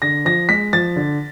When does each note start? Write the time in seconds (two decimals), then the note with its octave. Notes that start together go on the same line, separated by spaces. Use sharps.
0.02 D3 A#6
0.25 F3 A#6
0.49 G#3 B6
0.73 F3 A6
0.96 D3